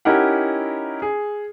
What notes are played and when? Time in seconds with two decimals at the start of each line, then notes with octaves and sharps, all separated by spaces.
0.05 C#4 D#4 E4 G4 A#4 F#5
1.02 G#4